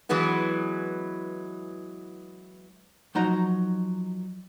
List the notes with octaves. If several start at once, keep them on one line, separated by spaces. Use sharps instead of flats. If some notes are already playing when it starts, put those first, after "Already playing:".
E3 F#3 G#3 B3 E4
F3 F#3 D#4 F#5 A#5